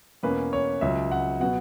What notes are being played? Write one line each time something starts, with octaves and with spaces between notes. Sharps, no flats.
E2 B2 A#3 C#4 B4
C#5
C#2 C#3 F#3 E5
F#5
B2 F#3 B3 F#5